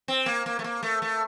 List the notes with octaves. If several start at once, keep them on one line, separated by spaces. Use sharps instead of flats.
C4
A#3
A#3
A3
A#3
A3
A3